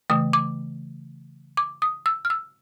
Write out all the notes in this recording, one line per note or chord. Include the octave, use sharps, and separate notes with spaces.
C#3 E3 A3 D#6
D6
D6
D#6
E6
F6
E6